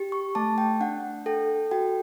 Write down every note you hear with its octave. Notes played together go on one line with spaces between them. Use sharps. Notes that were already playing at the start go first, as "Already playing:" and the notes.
Already playing: G4
C#6
A3 A5
G5
D4 F#5
A4 G5
F#4 G5